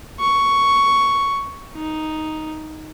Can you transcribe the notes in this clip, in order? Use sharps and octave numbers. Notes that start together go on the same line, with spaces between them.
C#6
D#4